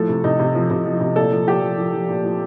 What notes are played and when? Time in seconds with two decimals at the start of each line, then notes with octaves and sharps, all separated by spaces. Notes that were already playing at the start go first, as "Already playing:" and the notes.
Already playing: A2 F3 A4
0.09 C3
0.24 C3 D#4
0.39 C3
0.55 F3
0.70 C3
0.85 F3
1.00 C3
1.16 A#2 A4
1.32 F3
1.47 F3 G4
1.62 F3
1.78 F3
1.93 F3
2.08 A#2
2.25 F3